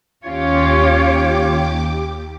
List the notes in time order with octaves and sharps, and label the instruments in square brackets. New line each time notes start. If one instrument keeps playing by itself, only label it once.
[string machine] D#2 G4 D6 [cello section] C#4 F4 C#5